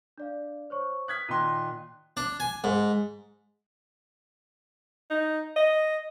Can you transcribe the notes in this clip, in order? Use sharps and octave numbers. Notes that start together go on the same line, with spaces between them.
D4 D5 F5
C5 C#5 C#6
D#6 F6 F#6 G#6 B6
A#2 D#3 C6 F#6 D#7
D4
G#5
G#2
D#4
D#5